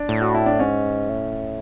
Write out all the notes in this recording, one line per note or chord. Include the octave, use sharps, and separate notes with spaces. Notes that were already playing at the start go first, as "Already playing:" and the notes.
Already playing: D4
A2
F#4
E4
D4
G#2 C#4
A2